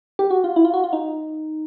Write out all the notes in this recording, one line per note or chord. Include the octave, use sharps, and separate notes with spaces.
G4
F#4
F4
E4
F4
F#4
F4
D#4